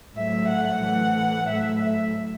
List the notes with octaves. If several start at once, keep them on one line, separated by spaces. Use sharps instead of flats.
A2 F#3 A3 E5
F#5
A2 E3 A3
A2 F#3 A3 E5
E5